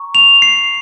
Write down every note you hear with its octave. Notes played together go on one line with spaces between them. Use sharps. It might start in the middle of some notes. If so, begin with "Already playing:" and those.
Already playing: A#5 C#6
F7
C7